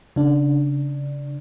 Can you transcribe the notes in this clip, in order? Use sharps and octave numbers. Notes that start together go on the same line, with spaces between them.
C#3 D4